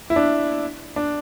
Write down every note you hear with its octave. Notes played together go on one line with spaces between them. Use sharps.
E4
D4
D4